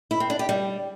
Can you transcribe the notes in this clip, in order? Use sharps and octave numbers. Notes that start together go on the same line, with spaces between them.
E4
C4
D4
G4
G3